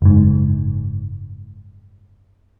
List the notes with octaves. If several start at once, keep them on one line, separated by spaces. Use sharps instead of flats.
F#1 G#2